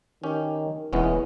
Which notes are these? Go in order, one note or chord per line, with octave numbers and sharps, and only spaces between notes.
D#3 C#4 G4
E1 E3 G#3 B3 C#4